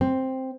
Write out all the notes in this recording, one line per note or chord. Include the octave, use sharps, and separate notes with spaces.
C4